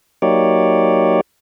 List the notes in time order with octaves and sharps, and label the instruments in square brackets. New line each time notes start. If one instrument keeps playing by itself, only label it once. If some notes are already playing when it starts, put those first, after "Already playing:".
[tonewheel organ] F#3 A#3 D#4 G4 C#5 D5